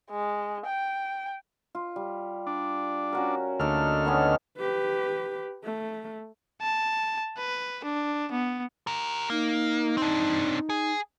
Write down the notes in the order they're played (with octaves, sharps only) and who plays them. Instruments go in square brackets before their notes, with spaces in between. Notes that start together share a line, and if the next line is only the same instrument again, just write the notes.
[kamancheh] G#3
G5
[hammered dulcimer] F4
G3
[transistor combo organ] D4
[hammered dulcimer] C#4 F#4 A#4
[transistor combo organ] D2 A3 F6 [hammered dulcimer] A#3 D#4 A#4
[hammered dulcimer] D#3 B3 C#4
[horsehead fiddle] G4 B4
A3
[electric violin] A5
B4
D4
B3
[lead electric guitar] G4 A#4
[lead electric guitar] A#3 [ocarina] D#4
[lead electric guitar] C4 D4
G#4